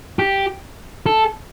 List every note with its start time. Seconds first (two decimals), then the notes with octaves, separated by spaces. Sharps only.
0.19 G4
1.06 A4